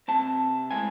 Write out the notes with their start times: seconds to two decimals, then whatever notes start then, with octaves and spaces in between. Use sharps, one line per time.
0.08 C3 E3 C4 A5
0.71 A2 G#3 C4 E4 G#5